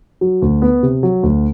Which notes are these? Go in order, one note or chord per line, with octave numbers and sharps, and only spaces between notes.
F#3
D2
B3
C3
F#3
D2